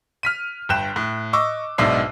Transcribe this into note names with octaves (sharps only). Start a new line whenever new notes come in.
F6 B6 D#7
G1 G2 G5 F#6 E7
A2
D#5 C#6 D6 E6
B1 G#2 B2 D4 E5 C7